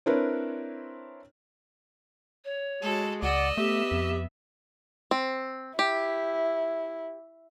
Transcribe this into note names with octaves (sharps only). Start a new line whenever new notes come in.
C4 D4 E4 A#4 B4 C#5
C#5
G#3 F#4 A4
C#2 D5 D#5 F#5 E6
A3 B3 G4 E5
F2
C4
E4 G4